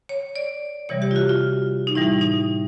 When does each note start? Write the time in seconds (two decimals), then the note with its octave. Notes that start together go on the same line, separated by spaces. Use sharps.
0.09 C#5
0.36 D5
0.89 C3 E3 G3 C#5
1.02 G4
1.11 F4
1.16 F#4
1.29 F4
1.87 D#4
1.95 A2 E3 G3 E4
2.21 D#4